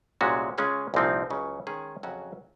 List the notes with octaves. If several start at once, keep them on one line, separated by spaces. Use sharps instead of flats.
C2 A#2 G#3 C#4 F#4
C#3 G#3 C#4 F4 G#4
C2 A#2 F3 C4 D#4
C#2 C#3 F#3 C#4
D#3 G#3 C#4 G#4
F2 C#3 F#3 C#4 F#4